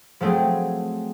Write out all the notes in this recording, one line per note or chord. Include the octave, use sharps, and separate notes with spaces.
F3 F#3 A3 C4 G#4